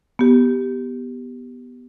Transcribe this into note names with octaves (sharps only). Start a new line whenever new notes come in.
B3 G4